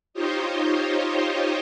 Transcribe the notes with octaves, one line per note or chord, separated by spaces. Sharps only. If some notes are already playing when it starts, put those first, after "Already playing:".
D#4 F4 G4 C5 C#5 D#5